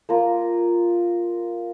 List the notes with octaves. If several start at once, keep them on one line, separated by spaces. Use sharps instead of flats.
A#3 F4 A#4